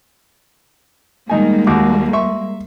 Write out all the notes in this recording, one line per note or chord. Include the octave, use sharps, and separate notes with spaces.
D#3 G3 G#3 A#3 D#4 G#5
D#2 F#4 D6
E5 C6 C#6